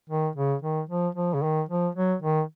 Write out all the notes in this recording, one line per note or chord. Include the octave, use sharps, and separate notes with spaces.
D#3
C#3
D#3
F3
F3
C#3
D#3
F3
F#3
D#3